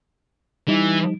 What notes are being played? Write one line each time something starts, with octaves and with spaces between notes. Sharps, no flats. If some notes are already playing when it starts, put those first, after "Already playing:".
E3 G3 D#4